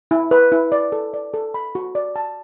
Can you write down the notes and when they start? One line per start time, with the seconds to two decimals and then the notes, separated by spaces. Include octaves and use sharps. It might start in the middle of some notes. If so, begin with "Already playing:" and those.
0.11 E4
0.31 B4
0.52 E4
0.72 D5
0.92 A4
1.14 D5
1.34 A4
1.54 B5
1.75 F#4
1.95 D5
2.16 A5